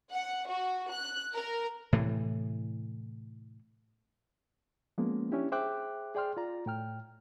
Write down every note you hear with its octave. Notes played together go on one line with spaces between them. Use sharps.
F#5
F#4
F#6
A#4
A2 C3 E3
F3 G#3 A#3 B3 C#4
C#4 D4 E4 G4
G#4 C5 E5 G5 D6 F#6
G#4 D5 G5 C6 F6
F4 D5 A#5
A2 G5 F6